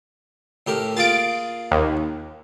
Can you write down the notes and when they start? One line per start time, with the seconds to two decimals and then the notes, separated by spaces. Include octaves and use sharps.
0.67 A2 G4 A#4
0.97 A#3 F4 G#4 A6 D7
1.72 D#2